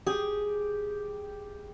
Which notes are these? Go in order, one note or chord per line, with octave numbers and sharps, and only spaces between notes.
G4 G#4